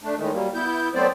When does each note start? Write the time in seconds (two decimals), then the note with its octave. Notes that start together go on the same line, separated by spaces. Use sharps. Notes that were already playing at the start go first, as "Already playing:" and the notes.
0.03 A3 D4
0.17 A2 D#3 G#3 A3
0.32 F#3 G3 A#3
0.54 B3 E4 G6
0.94 F#3 A3 B3 C4 C5 D5